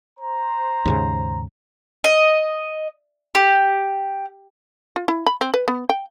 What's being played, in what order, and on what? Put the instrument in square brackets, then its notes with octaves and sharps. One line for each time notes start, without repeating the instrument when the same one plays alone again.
[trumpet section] C5 A#5
[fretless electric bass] D#2 G#2 C#3
[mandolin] D#5
G4
[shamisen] F4
E4
B5
C4
B4
B3
G5